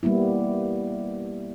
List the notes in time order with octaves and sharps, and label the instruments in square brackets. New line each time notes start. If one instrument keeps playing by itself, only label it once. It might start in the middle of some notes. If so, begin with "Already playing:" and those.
[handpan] G3 A#3 B3 E4